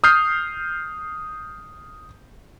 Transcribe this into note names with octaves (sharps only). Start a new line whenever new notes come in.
D#6 F6 G6 C7